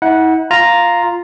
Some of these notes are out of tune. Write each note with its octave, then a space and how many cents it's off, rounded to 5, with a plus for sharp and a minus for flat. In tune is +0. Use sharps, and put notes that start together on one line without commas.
E4 -45 F#5 +0
F4 +0 A#5 +0